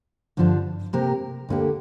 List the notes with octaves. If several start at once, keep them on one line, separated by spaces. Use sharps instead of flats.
G2 D3 F3 D4
C3 A#3 G4 A#4
D2 D3 A#3 G4